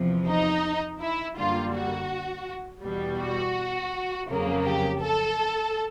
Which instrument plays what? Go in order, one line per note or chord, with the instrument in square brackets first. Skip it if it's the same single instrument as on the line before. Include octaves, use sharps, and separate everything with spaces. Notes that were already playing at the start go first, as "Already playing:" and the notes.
Already playing: [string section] E2 C3 F3
D#4
E4
F#2 D3 G3 A#3 F4
F#4
E2 B2 G3
F#4
F2 C#3 F#3 A#3
G4
A4